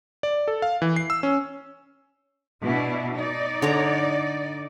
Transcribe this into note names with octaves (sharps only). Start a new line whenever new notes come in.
D5
A4
F5
E3
C7
E6
C#4
B2 D4 E4
D#4 D5
D3 C#5 A#5